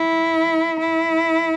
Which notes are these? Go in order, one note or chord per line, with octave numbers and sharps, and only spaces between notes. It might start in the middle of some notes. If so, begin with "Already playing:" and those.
Already playing: E4
E4